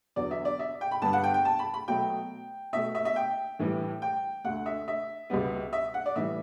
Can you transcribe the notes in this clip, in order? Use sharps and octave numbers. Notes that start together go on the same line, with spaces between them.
E2 D3 F#3 B3 D5
E5
D5
E5
G5
B5
G2 D3 G3 B3 A5
F#5
G5
G5
A5
B5
B5
B2 F#3 A3 G5
B2 A3 E5
E5
E5
G5
A2 E3 G3
G5
D2 D3 A3 F#5
E5
E5
C#2 B2 G3 B3
E5
F#5
D5
A2 E3 G3 E5